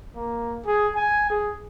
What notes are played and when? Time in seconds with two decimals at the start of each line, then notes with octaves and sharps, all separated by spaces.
0.16 A#3
0.66 G#4
0.95 G#5
1.30 G#4